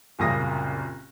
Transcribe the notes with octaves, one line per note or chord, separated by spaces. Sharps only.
F#1 C2 A#2 C#3 D#6 A#6